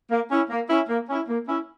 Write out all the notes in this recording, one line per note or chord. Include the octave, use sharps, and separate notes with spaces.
A#3
C#4 E4
A#3
C#4 E4
A#3
C#4 E4
A#3
C#4 E4